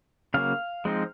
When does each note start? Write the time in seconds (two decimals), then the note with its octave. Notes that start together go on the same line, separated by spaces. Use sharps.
0.34 C#3 F#3 A#3 F5
0.85 F3 G#3 C4 D#4